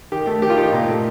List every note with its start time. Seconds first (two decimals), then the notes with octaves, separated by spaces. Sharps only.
0.12 D#3 G4
0.27 A3
0.42 D#3 G4
0.50 F4
0.58 D#4 G4
0.73 A#2
0.89 A3